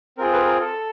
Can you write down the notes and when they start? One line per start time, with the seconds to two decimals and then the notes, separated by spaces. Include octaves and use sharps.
0.18 C4 F4 G#4 A#4
0.32 A4 B4
0.46 A#4
0.60 A4